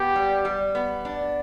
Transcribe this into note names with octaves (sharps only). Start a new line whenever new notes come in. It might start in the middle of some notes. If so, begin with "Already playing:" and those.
Already playing: B3 G4
G3
G3
B3
D4